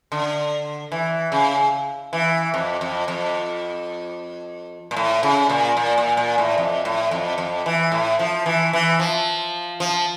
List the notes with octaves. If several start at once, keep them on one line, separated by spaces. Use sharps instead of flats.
D3
E3
C#3
E3
F2
F2
F2
A#2
A2
C#3
A#2
A#2
A#2
A#2
A2
F2
A2
F2
F2
E3
A2
F3
E3
E3
F3
F3